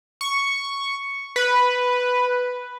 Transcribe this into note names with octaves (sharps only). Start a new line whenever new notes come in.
C#6
B4